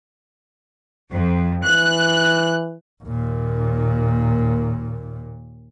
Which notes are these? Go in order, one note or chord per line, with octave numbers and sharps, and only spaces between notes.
F2
E3 F#6
D#2 A#2